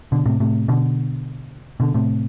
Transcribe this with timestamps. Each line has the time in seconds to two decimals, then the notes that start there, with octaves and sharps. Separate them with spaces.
0.12 B2 D3
0.26 A2 C3
0.40 A2 C3
0.68 B2 D3
1.80 B2 D3
1.94 A2 C3